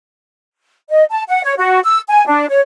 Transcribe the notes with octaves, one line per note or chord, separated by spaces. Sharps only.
D#5
A5
F#5
C#5
F#4
E6
G#5
D4
C#5